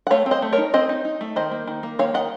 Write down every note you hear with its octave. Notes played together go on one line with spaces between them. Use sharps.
F#5
A3 C#5 F5
C4
C5 D#5
A3
A#4 C#5
D#4
C4 C5 D#5
D#4
D#4
A3
D#3 C5 D#5
A#3
D#3
A#3
D#3 C#5 F5
D#3 D#5 F#5